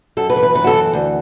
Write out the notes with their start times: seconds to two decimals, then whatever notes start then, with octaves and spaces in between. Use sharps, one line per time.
0.17 F#2 A4
0.30 B4
0.36 E3
0.43 B4
0.55 F#2 B4
0.64 F#4
0.67 A4
0.73 E3
0.93 D2